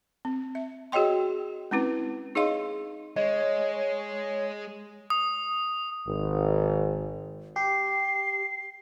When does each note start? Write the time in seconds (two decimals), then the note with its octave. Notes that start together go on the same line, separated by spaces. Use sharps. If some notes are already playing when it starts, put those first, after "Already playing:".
0.25 C4
0.55 E5
0.92 F#4 G#4 C#5 D#5 G5 C6
1.71 G#3 C4 C#4 E4 B4
2.35 D#4 G#4 C#5 D#5 F5 C6
3.16 G#3 C#5 D#5
5.10 D#6
6.07 G#1
7.56 G4 C7